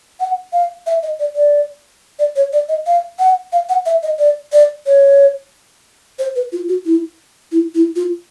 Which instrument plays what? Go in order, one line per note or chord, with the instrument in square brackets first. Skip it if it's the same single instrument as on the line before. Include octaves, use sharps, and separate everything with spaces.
[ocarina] F#5
F5
E5
D#5
D5
D5
D5
C#5
D5
D#5
F5
F#5
F5
F#5
E5
D#5
D5
D5
C#5
C5
B4
F4
F#4
E4
E4
E4
F4